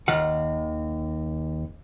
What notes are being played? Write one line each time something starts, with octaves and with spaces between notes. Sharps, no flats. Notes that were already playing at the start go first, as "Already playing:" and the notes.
D#2 D#3 F5 F#5